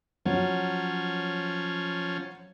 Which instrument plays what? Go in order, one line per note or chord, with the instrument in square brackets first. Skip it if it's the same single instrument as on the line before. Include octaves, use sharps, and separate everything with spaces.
[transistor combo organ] F3 C#4 [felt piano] F#3